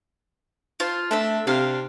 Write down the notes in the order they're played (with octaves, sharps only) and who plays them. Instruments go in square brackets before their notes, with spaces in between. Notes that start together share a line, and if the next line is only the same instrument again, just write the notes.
[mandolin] F4 C5 A5
[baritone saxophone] A3 [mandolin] C4 D4 E5
[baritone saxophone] C3 [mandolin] D4 F5